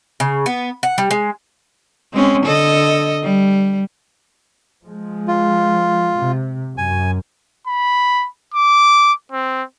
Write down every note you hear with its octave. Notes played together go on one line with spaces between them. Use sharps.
C#3
B3
F#5
G3
G#3
G#3 C4 C#4
D3 A4 D#5
G3
F3 G#3
F4
C3
F#2 G#5
B5
D6
C4